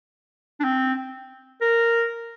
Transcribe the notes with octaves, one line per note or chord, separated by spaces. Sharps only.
D4
C4
A#4